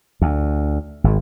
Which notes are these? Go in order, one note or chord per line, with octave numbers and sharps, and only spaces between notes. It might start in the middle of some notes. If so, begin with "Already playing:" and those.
D2
G#1